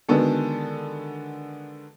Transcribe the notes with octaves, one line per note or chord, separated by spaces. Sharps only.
D3 D#3 G#3 B3 F#4 A4